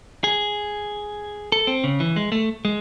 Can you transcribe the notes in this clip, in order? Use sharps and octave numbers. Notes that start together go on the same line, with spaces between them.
G#4
A4
C4
C#3
E3
G#3
A3
G#3